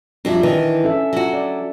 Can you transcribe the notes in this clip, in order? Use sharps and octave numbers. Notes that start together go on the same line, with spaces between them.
F2 F#3 G3 D4 E5
D#3 E3
C#4 A4 E5
F#3 F#4
D5